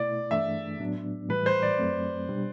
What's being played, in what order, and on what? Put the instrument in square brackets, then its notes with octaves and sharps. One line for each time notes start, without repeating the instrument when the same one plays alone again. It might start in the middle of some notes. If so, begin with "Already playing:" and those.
Already playing: [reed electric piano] B2 A3 E4 [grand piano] D5
[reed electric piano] G2 E3 A3 D4 [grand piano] E5
[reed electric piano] A2 F#3 B3 D4
[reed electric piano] A2 E3 G3 [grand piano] B4
[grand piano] C5
D5
[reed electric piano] F#2 F#3 A3 C4
B2 G3 D4